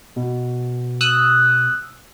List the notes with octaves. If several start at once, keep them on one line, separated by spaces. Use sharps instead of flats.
B2
D#6 E6 F#6